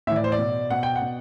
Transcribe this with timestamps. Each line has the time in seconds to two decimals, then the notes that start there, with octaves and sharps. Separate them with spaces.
0.07 A2 E5
0.11 E3 D5
0.24 C5
0.32 D5
0.39 B2
0.70 B2 F#5
0.83 G5
0.96 F#5
1.02 B2